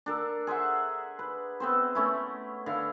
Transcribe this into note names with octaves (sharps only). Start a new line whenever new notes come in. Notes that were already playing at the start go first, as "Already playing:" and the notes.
D4 A4 A#4
G#4 C5 E5 F#5
B4
B3 C4 C5
A3 C#4 E4
D3 E4 F5